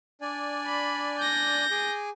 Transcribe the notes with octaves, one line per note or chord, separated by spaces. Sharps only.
D4 D5 G#5
B5
G6 A#6
G#4 G#5 D6